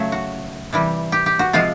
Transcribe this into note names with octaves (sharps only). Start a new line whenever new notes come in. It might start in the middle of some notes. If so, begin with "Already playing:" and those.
Already playing: C#3 F#3 A3
F#4
C3 E3 G3
G4
G4
F#4
C3 F3 G#3 F4